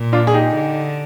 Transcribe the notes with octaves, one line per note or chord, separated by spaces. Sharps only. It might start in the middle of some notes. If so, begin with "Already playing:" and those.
Already playing: A#2
D4 F4
G#4
D#4 G4
D3